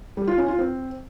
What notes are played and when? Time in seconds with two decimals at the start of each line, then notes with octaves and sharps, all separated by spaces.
0.17 G3
0.27 F4
0.38 C#4
0.48 F4
0.59 C4